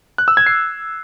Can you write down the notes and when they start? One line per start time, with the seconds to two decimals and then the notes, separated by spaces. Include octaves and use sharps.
0.18 F#6
0.28 E6
0.37 G#6
0.46 C7